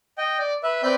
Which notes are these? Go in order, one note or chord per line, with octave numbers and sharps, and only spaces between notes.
D#5 G5
D5
B4 E5
C4 B4 D5 G5 G6